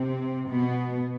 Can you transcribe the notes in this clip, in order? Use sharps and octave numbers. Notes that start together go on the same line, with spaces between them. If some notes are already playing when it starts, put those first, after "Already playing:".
Already playing: C3 C4
B2 B3